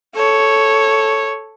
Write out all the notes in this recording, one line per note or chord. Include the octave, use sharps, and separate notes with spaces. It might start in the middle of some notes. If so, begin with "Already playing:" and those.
A4 C#5